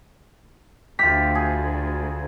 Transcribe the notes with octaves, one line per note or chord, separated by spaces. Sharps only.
D2 F4 G4 B6
G#4